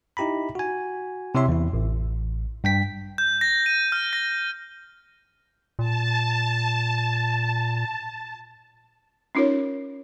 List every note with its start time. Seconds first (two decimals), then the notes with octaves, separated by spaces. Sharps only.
0.17 D#4 E4 G4 A#5 B5
0.55 F#4 G#5
1.35 C3 E4 C#5 E5 C6
1.48 E2 E4
1.73 A1
2.64 G2 G5 B6
3.18 G6
3.41 A#6
3.66 D#7
3.92 F6
4.13 A#6
5.79 A#2 A5
9.35 C#4 D#4 F4 A#4 C#5